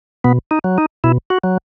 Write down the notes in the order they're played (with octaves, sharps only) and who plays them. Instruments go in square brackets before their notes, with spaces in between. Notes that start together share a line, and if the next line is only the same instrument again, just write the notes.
[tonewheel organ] B2 B3
D#4
F#3
D#4
B2 E4
F#4
F#3